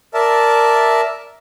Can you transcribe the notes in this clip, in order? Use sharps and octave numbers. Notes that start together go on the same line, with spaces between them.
A#4 D5 E5 A5